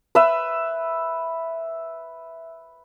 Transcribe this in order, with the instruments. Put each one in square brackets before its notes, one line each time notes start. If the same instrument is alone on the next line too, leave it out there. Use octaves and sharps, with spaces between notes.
[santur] B4 E5